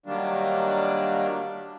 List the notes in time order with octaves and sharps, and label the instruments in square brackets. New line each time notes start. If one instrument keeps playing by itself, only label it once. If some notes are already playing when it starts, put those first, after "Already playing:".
[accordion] D#3 F#3 G3 A#3 D4